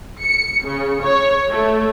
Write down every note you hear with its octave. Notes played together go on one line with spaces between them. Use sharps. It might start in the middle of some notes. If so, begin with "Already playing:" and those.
C#7
C#3
C#5
A3